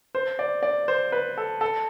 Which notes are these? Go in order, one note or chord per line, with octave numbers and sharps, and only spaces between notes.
C5
D5
D5
C5
B4
A4
A4